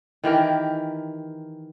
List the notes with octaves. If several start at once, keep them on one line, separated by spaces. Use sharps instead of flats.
D#3 E3 G4 A#4